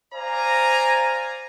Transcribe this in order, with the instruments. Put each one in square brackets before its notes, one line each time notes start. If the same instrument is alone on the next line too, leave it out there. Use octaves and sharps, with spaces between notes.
[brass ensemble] C5 D5 F5 G#5 A#5